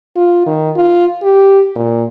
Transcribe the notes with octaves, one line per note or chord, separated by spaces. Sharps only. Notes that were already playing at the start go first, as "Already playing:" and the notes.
F4
D#3
F4
G4
A#2